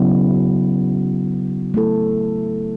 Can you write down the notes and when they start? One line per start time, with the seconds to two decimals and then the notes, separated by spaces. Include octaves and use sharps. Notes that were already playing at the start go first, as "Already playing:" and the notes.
Already playing: C#3 F#3 B3 E4
1.74 A3 E4 A4